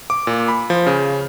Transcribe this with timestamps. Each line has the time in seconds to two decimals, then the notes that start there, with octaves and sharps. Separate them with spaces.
0.10 D6
0.27 A#2
0.48 B5
0.70 F3
0.87 C#3